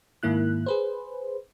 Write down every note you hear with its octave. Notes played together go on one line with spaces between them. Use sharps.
G#2 D#3 A#3 E4 F#6
G#4 B4 C5